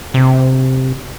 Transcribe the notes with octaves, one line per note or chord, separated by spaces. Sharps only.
C3